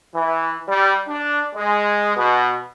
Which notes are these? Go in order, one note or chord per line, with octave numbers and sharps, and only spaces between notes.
E3
G3
D4
G#3
B2